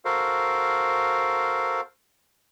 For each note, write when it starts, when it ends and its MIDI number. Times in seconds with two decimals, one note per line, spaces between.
0.05 1.81 66
0.05 1.81 69
0.05 1.81 70
0.05 1.81 72
0.05 1.81 77